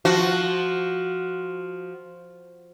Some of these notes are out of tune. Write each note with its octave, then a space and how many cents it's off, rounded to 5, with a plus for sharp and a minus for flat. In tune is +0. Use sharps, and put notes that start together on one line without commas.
F3 +0 F#4 +0